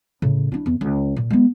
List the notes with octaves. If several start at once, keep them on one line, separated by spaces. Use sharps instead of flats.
A2 C#3
D4 E4
E2
C#2
A#2
G#3 B3